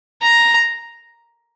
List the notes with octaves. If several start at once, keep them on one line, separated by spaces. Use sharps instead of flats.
A#5